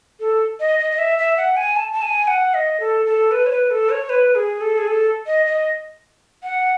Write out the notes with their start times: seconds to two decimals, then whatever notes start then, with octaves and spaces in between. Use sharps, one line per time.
0.20 A4
0.60 D#5
0.79 D#5
0.91 D#5
0.99 E5
1.18 E5
1.37 F#5
1.57 G#5
1.76 A5
1.93 A5
2.02 G#5
2.28 F#5
2.54 D#5
2.80 A4
3.06 A4
3.31 B4
3.46 C#5
3.51 B4
3.71 A4
3.90 C#5
4.10 B4
4.35 G#4
4.61 A4
4.78 G#4
4.88 A4
5.27 D#5
5.46 D#5
6.43 F#5